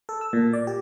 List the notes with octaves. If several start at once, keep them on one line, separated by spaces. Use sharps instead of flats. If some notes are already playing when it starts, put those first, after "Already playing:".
A4
E6
A#2
D5
G4